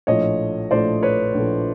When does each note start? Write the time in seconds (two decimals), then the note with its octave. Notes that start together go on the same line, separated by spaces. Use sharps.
0.07 A#1 A2 F3 A3 C#5 D#5
0.71 A#1 A2 F3 A3 C5 D5
1.03 B4 C#5
1.35 A#1 A2 F3 A3